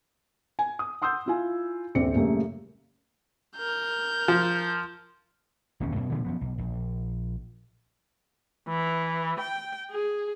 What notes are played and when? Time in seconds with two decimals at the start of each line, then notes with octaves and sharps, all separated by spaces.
0.59 G#5
0.79 D#6
1.02 F#5 C6 D#6 E6 G6
1.26 E4 F4 G#5
1.95 D#1 A#1 C4 D5 C#7
2.15 F#2 A#2 C#3 G3 A3 A#3
3.57 A#4 G6
4.28 F3
5.80 E1 D#2 A#2 C#4
5.96 F#2 B2
6.12 A#2 D3 F3 A3
6.24 F#2 F3 B3
6.41 B1
6.58 A#1
8.68 E3
9.40 G5
9.91 G#4